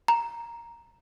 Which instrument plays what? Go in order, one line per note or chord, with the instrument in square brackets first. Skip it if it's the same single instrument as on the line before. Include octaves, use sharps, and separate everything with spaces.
[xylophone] A#5